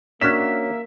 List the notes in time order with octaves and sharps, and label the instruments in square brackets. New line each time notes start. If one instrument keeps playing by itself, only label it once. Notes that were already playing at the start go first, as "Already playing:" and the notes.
[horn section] A#3 [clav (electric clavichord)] C#4 F#4 [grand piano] D4 B6 E7 [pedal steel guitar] E5